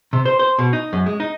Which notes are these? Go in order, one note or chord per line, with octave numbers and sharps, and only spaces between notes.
C3
C5
C5
B2
D#4
F#2
G#3
D#4